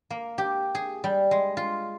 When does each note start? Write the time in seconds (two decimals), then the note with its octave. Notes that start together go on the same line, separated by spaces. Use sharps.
0.10 A#3
0.38 G4
0.75 G#4
1.04 G3
1.31 G#3
1.57 F4